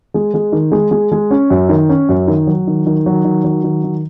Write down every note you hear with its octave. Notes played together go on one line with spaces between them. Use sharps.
G#3
G#3
D#3
G#3
G#3
G#3
C#4
F#2
D#3
C#4
F#2
D#3
F#3
D#3
D#3
F#3
D#3
F#3
D#3
D#3